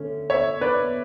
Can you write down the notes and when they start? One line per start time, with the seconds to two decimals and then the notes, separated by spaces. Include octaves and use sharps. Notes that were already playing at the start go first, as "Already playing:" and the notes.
Already playing: D3 A3 C#4
0.30 C#5 E5
0.61 B4 D5